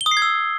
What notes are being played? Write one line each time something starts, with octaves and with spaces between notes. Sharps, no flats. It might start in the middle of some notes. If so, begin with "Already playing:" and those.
G7
D#6
C7
G#6
E6